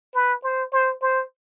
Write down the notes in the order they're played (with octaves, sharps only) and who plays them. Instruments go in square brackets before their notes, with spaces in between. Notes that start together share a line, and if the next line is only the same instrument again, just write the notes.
[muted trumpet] B4
C5
C5
C5